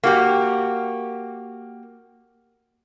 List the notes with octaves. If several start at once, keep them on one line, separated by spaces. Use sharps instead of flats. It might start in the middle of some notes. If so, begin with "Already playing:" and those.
A#3 F#4 G4